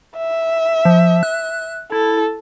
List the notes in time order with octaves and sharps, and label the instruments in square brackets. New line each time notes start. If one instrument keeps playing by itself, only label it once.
[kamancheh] E5
[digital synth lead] F3
F#6
[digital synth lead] E4 [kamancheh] A4